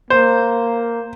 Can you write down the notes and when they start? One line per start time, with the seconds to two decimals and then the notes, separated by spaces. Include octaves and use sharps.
0.10 A#3 C5